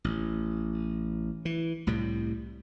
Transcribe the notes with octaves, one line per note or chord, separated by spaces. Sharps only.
A1
E3
C2 A2 C3 G3